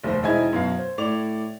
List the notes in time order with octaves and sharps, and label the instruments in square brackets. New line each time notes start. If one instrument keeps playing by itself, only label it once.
[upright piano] F1 D#2 C5
E1 C4 D#4 E4 G#5 G#6
F#2 B2 F5
C5
A2 D5 F7